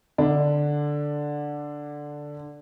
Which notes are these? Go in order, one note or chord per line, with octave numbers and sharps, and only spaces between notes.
D3 D4